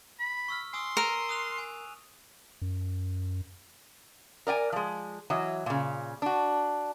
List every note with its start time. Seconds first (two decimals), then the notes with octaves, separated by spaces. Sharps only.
0.20 B5
0.48 C#6 E6 F6
0.74 G#5 C6 D#6 E6
0.97 A#4 E6 D#7 E7
1.29 D#6 F#6 F7
1.58 G#5
2.62 F#2
4.47 A#4 D5 G5 G#5
4.72 F3 G#3
5.30 E3 F#3 D#5
5.66 A#2 C#3
6.22 D4 F#4